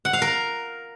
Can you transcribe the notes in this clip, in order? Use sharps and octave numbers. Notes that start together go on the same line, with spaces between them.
F#5
F5
A#4